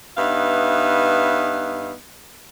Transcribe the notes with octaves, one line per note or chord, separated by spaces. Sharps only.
G2 B3 D#4 E5 F5